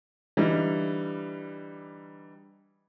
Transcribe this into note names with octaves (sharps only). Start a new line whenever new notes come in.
D3 E3 G3 D#4